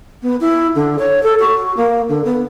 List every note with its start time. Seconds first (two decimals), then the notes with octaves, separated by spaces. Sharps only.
0.22 B3
0.40 E4
0.75 D3
0.98 C#5
1.23 A4
1.39 F#4
1.76 A#3
2.08 D3
2.24 B3